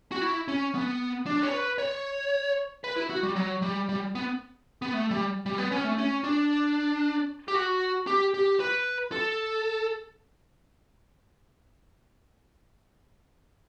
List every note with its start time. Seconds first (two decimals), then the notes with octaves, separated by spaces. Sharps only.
0.12 F#4
0.22 E4
0.48 C#4
0.75 B3
1.26 D4
1.43 C#5
1.53 B4
1.78 C#5
2.84 B4
2.96 E4
3.10 F#4
3.23 G3
3.36 F#3
3.62 G3
3.89 G3
4.15 B3
4.82 B3
4.93 A3
5.11 G3
5.46 G3
5.58 B3
5.72 C#4
5.84 A3
5.98 C#4
6.24 D4
7.48 G4
7.55 F#4
8.07 G4
8.34 G4
8.60 B4
9.12 A4